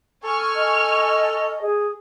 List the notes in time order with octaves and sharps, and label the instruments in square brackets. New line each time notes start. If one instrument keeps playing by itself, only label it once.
[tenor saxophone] A4 [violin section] G#5 C#6 F6
[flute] D#5
G#4